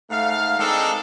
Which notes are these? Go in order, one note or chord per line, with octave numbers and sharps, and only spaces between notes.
G#2 A3 F5
D#3 G#3 C4 D4 A4